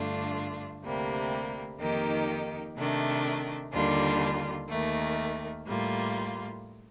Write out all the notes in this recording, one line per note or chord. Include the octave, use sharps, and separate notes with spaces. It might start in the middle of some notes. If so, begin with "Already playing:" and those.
Already playing: G2 D3 A3 D4 F4
D2 C3 G3 A#3
F2 D#3 A#3 D#4 G4
C3 D#3 A3 D4
D#2 D3 G3 D4 F4
D#2 D#3 A3
A2 G3 A#3 F4